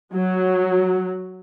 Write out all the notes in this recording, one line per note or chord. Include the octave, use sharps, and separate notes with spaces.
F#3